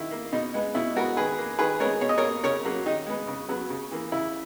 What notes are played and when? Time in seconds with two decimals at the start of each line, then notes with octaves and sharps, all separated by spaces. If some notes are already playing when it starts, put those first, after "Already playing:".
Already playing: D#3 E4
0.11 A#3
0.32 B2 D#4
0.54 G#3 B3
0.75 B2 E4
0.96 G#3 B3 F#4 A#4
1.17 D#3 G#4 B4
1.38 A#3
1.59 D#3 G#4 B4
1.80 G#3 B3 A#4 C#5
2.01 B2 C#5
2.09 D#5
2.18 A#3 A#4 C#5
2.44 C#3 A#4 C#5
2.65 F#3 A#3
2.86 D#3 D#4
3.07 G#3 B3
3.28 C#3
3.49 F#3 B3
3.70 C#3
3.91 E3 A#3
4.12 C#3 E4